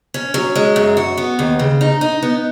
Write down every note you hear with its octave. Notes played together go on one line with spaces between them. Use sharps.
C#4
F#3
G#3
F#2
F#4
B3
D#2
C#3
D#4
D#4
B3